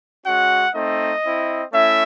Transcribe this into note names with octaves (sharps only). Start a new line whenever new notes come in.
G#3 C#4 F#4 F#5
A3 C4 D#4 D#5
C4 E4
A3 C#4 E4 E5